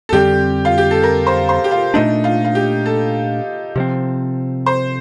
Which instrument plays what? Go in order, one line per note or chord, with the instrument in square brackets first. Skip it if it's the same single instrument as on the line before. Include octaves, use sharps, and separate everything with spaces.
[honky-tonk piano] A4
[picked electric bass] F2 D3 G3 C4 [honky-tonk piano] G4
[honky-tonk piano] F4
G4
A4
A#4
C5
C5
G4
F4
[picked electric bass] A#2 A3 D4 [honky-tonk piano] D#4
[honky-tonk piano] F4
F4
G4
A4
[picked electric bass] C3 F3 C4
[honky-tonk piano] C5